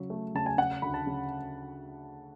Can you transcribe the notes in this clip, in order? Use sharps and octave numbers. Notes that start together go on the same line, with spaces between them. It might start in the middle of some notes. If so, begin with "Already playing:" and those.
Already playing: C#3 F#3
A3
C#3 A5
G#5
C#3 F#5
D2 B5
A5
C#3